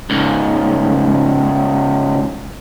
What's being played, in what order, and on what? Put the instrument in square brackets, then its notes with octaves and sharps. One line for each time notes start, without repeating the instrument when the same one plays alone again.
[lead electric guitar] C#2 G#2